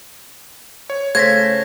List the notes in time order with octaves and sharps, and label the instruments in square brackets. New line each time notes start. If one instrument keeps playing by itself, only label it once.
[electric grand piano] C#5
[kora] C#3 [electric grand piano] A3 C5 [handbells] G#6 A#6 B6